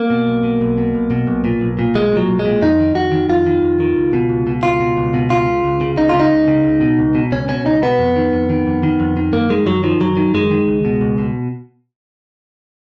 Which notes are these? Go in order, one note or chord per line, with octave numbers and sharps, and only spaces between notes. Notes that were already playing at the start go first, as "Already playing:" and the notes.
Already playing: A#3
B2
B1
B2
B1
B2
B1
B2
B1
A#2
B1
A#2
B1 G#3
A#2 F#3
B1
G#3
A#2
F2 D#4
D#3
F2 F#4
D#3
F2 F4
D#3
F2
D#3
C#2
B2
C#2
B2
C#2 F4
B2
C#2
B2
C#2 F4
C#3
C#2
C#3
C#2 D#4
C#3 F4
D#4
C#2
C#3
C#2
B2
C#2
B2
C#2 C#4
B2 C#4
C#2 D#4
B2 B3
F2
D#3
F2
D#3
F2
D#3
F2
D#3
F#2 A#3
D#3 G#3
F#2 F#3
D#3 F3
F#2 F#3
D#3
F#2 G#3
D#3
C#2
B2
C#2
B2